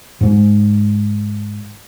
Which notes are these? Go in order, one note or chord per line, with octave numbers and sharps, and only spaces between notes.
G#2 G#3